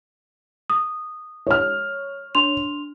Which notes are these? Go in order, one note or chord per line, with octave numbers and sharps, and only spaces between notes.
D#6
C#5 F6
D4 C6 F7